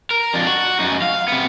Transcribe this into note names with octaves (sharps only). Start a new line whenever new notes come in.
A#4
F2 D4
F#4
F#2 D#4
F5
C3 B3